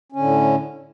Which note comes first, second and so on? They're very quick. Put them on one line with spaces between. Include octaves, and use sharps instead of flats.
C#4 D3 A2